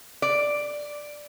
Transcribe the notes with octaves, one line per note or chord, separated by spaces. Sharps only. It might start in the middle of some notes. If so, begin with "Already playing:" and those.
D5